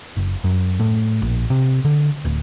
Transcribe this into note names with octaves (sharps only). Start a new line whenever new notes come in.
F#1
F#2
A2
A#1
C3
D3
D1